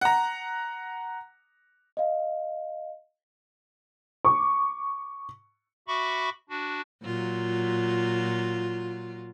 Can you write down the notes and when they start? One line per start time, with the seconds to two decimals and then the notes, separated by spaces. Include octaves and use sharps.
0.01 F#5 A#5
1.97 D#5 F5
4.25 C#6 D6
5.88 F#4 E5 B5 C#6 D6
6.50 D4 F#4
7.03 A#2 F#3 F4